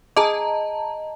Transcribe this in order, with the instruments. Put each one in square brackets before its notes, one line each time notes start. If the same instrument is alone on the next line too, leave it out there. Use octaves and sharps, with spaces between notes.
[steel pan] G#4 D6 [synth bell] D#5 A5 A#5